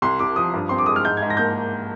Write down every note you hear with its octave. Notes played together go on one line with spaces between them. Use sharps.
C2 C6
C2 D6
F3 D#6
G2
C4 C6
D6
G#3 D#6
F6
G#2 G6
G#6
G#2
A#6
A#3 G6